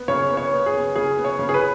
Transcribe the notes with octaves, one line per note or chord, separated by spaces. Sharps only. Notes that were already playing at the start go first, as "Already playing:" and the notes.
Already playing: B3
C#3 C#5
B3
C#5
B3
G#4
C#3
C#3 G#4
B3
C#5
C#3
G#4
B4